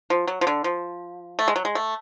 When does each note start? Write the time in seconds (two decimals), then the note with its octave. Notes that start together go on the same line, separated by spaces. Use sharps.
0.10 F3
0.27 F#3
0.41 F3
0.47 D3
0.64 F3
1.39 A3
1.48 G#3
1.56 F#3
1.65 G#3
1.75 A3